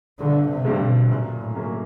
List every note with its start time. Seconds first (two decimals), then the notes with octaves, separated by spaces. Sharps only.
0.19 G1 D3
0.50 C3
0.65 G2 D3 G3 C4
0.80 B2
1.09 F#2 A#2
1.40 A2
1.55 C#3 F#3 A#3 C#4